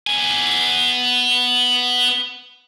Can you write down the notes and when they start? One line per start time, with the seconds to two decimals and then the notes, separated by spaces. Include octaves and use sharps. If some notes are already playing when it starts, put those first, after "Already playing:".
0.07 B3 G#5